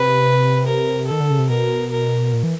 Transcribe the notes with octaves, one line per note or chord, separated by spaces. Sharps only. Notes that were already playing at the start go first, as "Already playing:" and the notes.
Already playing: C3 B4
A#4
D#3 A4
D3
C#3
C3
B2 A#4
A#4
A#2
E3